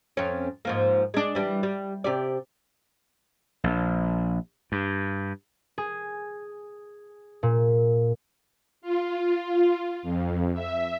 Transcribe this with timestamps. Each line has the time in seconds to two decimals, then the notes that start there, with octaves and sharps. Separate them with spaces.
0.17 F2 C#4
0.65 G#2 F3 A#3
1.14 G#3 D4
1.35 E3 G3 D4
1.63 G3
2.04 C3 G4 D5
3.64 A#1
4.72 G2
5.78 G#4
7.43 A#2
8.82 F4
10.03 F2
10.54 E5